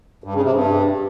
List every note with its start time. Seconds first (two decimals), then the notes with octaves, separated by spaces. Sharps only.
0.24 G2
0.34 C#3
0.44 C3
0.54 G2